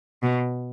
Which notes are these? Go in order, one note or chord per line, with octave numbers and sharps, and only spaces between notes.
B2